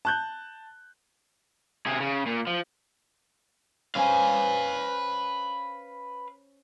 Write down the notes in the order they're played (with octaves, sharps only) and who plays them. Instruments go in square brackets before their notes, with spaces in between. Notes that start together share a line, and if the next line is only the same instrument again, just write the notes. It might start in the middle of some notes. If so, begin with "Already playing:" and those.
[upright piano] A5 F#6 G6
[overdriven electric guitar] C3 G#4
C#3
A#2
F3
[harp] C#4 C5 G#5 [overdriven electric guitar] B4 F5